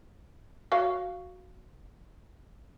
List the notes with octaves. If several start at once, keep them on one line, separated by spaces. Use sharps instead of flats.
F#4 C#5 F5